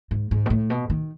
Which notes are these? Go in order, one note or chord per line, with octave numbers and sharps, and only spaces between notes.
G#2
G#2
B2
A2
B2
D#3